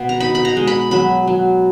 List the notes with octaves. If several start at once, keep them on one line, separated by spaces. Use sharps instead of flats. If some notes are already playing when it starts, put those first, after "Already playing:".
Already playing: B2
A#5
D#4 B5
B5
A#5
G#3
B5
F#3 B5
F#3